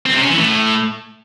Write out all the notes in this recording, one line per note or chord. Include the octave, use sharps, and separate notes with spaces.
C4
C3
C#4
E3
A2